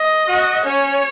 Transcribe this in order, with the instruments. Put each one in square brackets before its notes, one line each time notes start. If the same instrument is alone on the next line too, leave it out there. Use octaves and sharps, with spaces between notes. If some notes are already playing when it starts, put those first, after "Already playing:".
Already playing: [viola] D#5
[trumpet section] F#4
[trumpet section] C#4 [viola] C#5